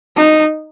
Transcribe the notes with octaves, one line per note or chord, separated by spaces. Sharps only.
D#4